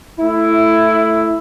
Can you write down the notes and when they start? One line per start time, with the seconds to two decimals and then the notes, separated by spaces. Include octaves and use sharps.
0.19 A3 E4